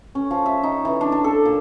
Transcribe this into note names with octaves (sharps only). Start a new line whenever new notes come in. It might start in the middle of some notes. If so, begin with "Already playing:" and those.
C#4
F3
E5
D#4
E3
D4
D4
A4
A#2